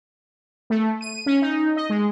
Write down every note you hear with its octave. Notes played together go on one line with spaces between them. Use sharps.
A3
D#7
C#4
D#4
D#5
G#3